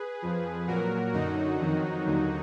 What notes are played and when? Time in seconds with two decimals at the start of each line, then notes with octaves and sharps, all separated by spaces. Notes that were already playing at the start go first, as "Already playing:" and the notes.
Already playing: G#4 B4
0.22 F2 F3
0.67 A#2 F#3 F#4 A#4
1.13 F#2 D3 F#3 D#4 F#4
1.59 F2 D#3 F#3
2.06 D#2 D3 F#3